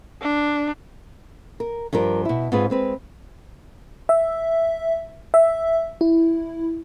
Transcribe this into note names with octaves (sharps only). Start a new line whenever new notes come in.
D4
A#4
G2 F3 G4 A#4
B2 E4
G#2 C4 F4 G#4 B4
G#3 C4 B4
E5
E5
E4